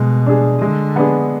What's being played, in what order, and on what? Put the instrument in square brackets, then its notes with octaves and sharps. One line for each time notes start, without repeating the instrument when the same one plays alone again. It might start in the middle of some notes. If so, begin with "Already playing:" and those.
Already playing: [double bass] B2 [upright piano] G#3
[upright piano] D4 G#4
[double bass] D3 [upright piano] G#3
[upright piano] B3 D4 G#4